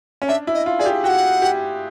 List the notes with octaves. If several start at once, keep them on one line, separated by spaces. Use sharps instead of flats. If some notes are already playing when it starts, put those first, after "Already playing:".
C#4
D4 E5
E4
D#5
F4
G#4 D5
G4
F#4 F#5 G5
G4